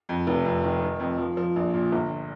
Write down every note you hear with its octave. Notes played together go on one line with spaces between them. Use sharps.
F2
F1
F2
D#3
D#3
F2
F3
F3
A#1
A#2
G1